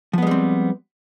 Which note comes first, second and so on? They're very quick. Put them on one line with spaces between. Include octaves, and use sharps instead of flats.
F3 B3 G#3 G3 C4